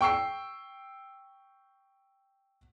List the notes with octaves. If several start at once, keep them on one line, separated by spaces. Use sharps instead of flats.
G5 C#6 E6 C7